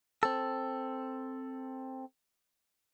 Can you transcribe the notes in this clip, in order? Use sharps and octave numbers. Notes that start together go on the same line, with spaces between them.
C4 A4